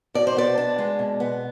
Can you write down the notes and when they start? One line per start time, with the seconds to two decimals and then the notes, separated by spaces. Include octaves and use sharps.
0.14 B2 D5
0.27 C5
0.37 B3 D5
0.58 D4
0.78 G#3
0.99 B2
1.20 B3